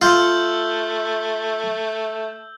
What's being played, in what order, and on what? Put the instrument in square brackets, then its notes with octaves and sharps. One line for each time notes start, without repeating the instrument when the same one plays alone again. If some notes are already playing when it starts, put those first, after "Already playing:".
[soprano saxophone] A3 [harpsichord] F4 [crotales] E6 G6 G7